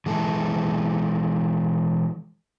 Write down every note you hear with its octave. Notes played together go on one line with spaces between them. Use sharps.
E3 G#3 A4